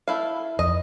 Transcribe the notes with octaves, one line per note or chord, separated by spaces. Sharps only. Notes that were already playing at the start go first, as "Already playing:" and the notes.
A3 E4 F5
F2 D#5